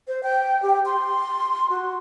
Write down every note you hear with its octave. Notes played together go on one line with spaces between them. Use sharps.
C5
G5
G4
C6
F#4